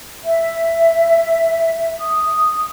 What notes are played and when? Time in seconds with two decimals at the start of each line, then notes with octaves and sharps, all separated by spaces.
0.22 E5
1.99 D#6